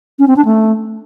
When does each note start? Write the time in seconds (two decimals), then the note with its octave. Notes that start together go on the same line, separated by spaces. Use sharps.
0.19 C#4
0.28 C4
0.36 D4
0.45 A3